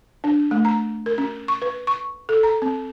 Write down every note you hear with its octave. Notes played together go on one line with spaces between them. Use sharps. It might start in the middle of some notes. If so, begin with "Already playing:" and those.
D4
A3
A#5
A#4
C#4
C#6
B4
C#6
A4
A#5
C4